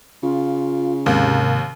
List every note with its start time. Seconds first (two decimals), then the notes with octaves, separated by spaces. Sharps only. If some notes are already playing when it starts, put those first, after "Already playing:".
0.23 C#3 F4
1.06 D#2 G#2 C3 A#4